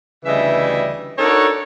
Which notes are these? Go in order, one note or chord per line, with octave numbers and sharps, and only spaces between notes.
D2 C#3 E3 G3 D#5 E5
D4 D#4 F#4 A4 A#4 C#5